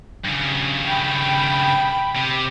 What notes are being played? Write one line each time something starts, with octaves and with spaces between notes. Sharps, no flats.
G2 C#3
G5 B5
C3